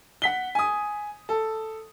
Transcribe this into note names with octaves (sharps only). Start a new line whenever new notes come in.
F#5 B6 G7
G#5 D#6
A4